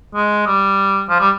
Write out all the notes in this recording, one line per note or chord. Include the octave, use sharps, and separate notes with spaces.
G#3
G3
F3
G3